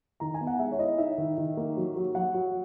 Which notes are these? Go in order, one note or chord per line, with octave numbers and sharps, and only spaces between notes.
D#3 A#5
G#5
B3
F#5
G#3 E5
C#5
E4 D#5
D#4 E5
D#3
D#3
A#3
F#3
F#3
F#3 F#5
F#3